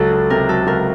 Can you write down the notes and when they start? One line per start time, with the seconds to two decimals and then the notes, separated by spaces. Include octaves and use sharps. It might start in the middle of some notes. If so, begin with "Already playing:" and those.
Already playing: C#2 F#3 A4
0.12 C#2
0.30 C3 A#4
0.49 F#3 A4
0.67 C#2 A#4